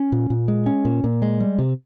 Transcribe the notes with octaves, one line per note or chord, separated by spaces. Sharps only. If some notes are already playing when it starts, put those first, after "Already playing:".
Already playing: C#4
A#2
A#2
G#3
C#4
A#2
A#2
G#3
G3
C3